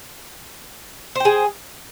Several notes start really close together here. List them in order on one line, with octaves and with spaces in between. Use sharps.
C5 G5 G#4